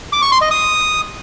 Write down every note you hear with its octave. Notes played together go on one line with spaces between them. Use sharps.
D6
C#6
C6
D#5
D#6